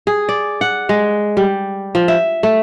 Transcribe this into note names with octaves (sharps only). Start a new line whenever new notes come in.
G#4
D5
F#5
G#3
G3
F3
E5
A3